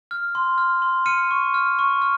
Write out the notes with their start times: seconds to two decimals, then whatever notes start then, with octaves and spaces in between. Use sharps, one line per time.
0.11 F6
0.35 C6
0.58 F6
0.82 C6
1.06 F6 C#7 D#7
1.31 C#6
1.54 F6
1.79 C#6
2.02 F6